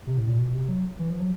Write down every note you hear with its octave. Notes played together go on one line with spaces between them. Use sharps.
C3
A2
A#2
B2
C3
F#3
E3
F3
F#3